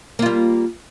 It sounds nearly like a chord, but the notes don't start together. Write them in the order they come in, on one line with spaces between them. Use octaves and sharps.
A#3 F4 G3